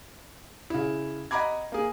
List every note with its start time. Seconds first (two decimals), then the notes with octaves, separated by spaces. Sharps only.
0.70 C#3 E4
1.31 D#5 F#5 A#5 B5 D6 G#6
1.72 A#3 G#4